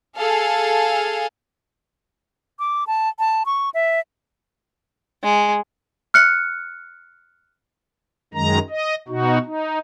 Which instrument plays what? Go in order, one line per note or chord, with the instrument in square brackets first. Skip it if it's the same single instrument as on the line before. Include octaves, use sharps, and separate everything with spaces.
[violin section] G#4 A4 F5
[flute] D6
A5
A5
C#6
E5
[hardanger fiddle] G#3
[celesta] F6 F#6 C#7
[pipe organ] F#2 D#3 G#3 A#5
D#5
B2 D#4 F#4
D#4